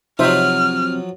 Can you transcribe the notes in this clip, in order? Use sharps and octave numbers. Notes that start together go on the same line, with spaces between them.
C3 F3 F#3 D#4 C5 E5 F6